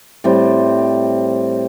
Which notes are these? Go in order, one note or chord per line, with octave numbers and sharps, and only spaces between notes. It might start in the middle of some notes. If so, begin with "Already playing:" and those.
A2 G3 C4